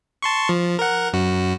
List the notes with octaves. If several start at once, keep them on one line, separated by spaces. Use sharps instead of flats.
A5 C6 C#6
F3
A#4 F#5
F#2 F#4